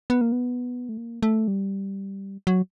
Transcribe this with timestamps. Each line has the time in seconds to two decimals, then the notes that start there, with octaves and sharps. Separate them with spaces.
0.10 B3
0.21 A#3
0.32 B3
0.89 A3
0.98 A#3
1.23 A3
1.48 G3
2.47 F#3